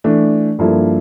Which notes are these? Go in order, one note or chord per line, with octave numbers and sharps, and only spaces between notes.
E3 A3 D4
G2 F3 A#3 E4 A4